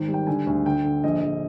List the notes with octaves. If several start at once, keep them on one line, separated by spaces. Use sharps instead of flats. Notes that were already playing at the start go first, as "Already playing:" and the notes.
Already playing: G#1 D#3
G3
G5
D3 G#5
D2
D3 G5
D3
A#1 D#5
A#1